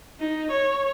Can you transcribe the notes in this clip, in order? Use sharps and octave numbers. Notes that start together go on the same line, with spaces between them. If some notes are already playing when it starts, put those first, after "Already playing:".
D#4
C#5